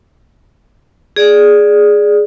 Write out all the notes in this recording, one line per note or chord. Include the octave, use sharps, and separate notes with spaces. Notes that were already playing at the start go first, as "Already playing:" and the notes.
G#4 D5